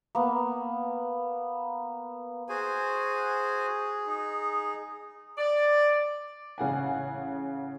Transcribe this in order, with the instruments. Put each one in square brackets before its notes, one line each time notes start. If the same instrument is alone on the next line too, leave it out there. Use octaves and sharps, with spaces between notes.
[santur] A#3 B3
[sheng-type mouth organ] F#4 C5 G#5 [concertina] G#4
[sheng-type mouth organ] D#4
[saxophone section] D5
[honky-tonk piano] A1 C#3 F#5 G#5